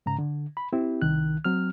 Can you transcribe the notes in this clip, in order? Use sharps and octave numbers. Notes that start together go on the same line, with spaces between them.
G#2 C#3 A#5
D3
B5
C4 E4 G4
C2 D#3 F#6
F#3 C4 F6